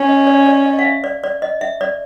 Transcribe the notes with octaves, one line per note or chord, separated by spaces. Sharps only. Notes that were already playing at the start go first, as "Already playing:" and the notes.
Already playing: C#4
D#5
D5
D#5
D5
D#5
F5
E5
D5
D5
D#5
E5
D5